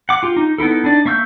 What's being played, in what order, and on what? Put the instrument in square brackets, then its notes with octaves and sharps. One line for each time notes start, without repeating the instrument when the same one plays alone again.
[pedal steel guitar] F#5 D6
F4 G4
D#4
B3 D#4 E4 A4
D4 D#4 D5
A#3 E5 C#6 E6 G6